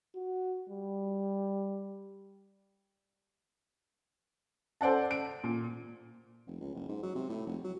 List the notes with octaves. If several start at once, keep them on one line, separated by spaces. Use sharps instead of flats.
F#4
G3
A4 C5 D5 F#5 A5
D7
A#2
F1
C#2
F#1
G#2
F#3
C3
A2
F1
F#3